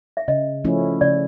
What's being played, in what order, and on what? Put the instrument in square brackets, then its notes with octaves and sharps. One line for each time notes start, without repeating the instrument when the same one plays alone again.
[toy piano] E5
[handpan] C#3 [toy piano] D#5
[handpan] F3 A3 C#4 E4
[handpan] C#3 [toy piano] D5